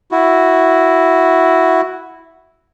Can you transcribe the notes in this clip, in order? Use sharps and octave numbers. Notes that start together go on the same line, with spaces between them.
E4 F#4